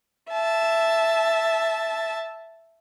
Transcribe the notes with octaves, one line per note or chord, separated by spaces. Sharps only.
E5 A5